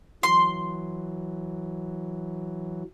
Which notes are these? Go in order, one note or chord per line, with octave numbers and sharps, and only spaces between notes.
E3 F#3 C6